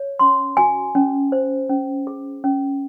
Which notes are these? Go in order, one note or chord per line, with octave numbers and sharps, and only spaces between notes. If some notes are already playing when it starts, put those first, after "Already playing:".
Already playing: C#5
C#4 C6
F#4 G#5
C#4
C5
C#4
G#4
C#4